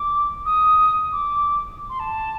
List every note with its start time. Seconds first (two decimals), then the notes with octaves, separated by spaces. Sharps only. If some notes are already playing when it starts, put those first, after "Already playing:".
Already playing: D6
0.46 D#6
1.12 D6
1.89 C6
2.00 A5